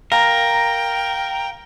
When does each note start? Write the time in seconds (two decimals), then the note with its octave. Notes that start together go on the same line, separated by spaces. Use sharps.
0.12 A#4 F5 G5 A#5